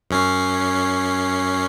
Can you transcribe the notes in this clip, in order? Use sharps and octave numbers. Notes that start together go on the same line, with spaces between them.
F#2 C#4 C7